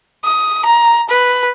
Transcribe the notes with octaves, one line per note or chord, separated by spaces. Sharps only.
D#6
A#5
B4